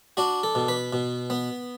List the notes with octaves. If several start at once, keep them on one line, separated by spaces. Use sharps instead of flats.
D4 F#4
A4
B2
B4
B2
B3